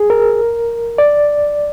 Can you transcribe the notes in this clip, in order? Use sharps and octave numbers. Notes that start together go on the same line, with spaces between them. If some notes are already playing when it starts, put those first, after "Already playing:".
Already playing: G#4
A#4
D5